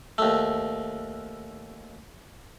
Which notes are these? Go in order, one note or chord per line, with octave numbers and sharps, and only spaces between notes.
D#2 A3